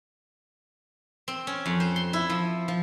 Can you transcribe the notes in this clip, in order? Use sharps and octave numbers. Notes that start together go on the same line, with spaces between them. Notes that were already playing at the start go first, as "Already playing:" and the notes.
C4
C#4
F2
C5
C6
E4
F3
F3